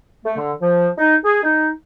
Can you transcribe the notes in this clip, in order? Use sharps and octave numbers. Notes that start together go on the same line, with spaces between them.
A3
D3
F3
D#4
G#4
D#4